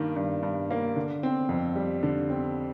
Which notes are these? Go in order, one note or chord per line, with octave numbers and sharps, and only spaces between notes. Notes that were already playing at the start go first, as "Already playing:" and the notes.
Already playing: G2 D#3 A#3
G2
G2
A#3
D3
C4
F2
G3
D3
C4